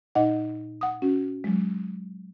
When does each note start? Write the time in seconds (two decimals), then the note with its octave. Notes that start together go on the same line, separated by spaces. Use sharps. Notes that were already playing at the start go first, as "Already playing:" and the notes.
0.15 A#2 D#4 D#5 F#5
0.81 F#5 D#6
1.02 C#4 F#4
1.44 F#3 G#3